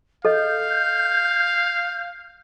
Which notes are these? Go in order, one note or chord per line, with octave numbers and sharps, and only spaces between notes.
A4 D#5 F5 G6